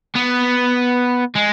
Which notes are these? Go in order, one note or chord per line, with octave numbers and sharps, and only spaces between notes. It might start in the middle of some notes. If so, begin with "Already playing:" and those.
B3
G#3